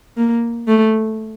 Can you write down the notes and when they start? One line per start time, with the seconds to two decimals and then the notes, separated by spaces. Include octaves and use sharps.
0.17 A#3
0.68 A3